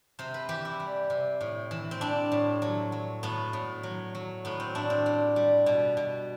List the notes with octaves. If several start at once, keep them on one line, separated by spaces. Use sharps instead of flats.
C3 C5
B4
E3 G4
E4
G3
C3
A2
E3
C4
G3 D4
A2
F#3
F#3
A2 B3
A2
F#3
F#3
A2 B3
C4
A2 D4
C4
G3
G3
B2
B2